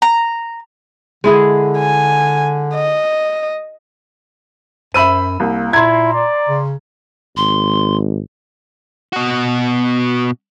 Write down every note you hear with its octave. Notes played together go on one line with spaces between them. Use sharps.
A#5
D3 G#3 E4 G#4
G#5
D#5
F#2 C5 E5 B5 E6 D#7
C2 A#3
A#2 E4 A#5 C6 G#6
D5
C#3
G#1 C6
B2 F#4